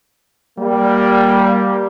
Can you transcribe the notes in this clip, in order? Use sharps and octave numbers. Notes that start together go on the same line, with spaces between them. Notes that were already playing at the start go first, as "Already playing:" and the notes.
G3 A#3